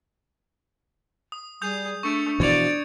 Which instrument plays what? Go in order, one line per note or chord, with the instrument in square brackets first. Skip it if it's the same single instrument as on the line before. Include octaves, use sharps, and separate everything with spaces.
[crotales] D#6
[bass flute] G3 [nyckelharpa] G#4 [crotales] D#6 G6 F7
[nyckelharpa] A3 [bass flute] D4 [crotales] C#6 C#7 D7
[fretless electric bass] B2 E3 F3 [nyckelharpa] D5 [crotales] G#6 C#7 F7